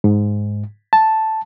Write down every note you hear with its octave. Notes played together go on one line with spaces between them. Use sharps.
G#2
A5